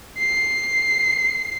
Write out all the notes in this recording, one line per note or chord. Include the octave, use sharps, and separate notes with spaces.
C7